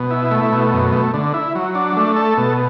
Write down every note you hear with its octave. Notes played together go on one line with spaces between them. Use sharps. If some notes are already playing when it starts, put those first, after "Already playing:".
Already playing: B2
E4
A3
B2
F#2
A3
D3
E4
F#3
D4
A3
A4
B2